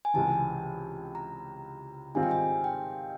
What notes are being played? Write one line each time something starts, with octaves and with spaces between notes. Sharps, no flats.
G#5
C#2 C3 E3 A5
A#5
G#2 D#3 G3 C4 F4 G#5
G5
G#5
G5